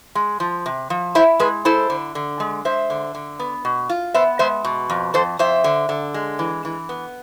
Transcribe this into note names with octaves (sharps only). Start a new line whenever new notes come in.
G#3
F3
C3
F3
E4 C5 E5
G#3 G#4 B4
E4 A4 C5
D3
D3
G#3
G#3 C5 E5
D3
D3
B3
B2
F4
B3 C5 E5
G#3 C5 E5
B2
F2
F2 A4 C5
F2 C5 E5
D3
D3
G#3
E3
E3
B3